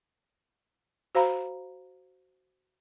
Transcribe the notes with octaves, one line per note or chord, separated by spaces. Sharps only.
F#4 C5 F5 A#5 B5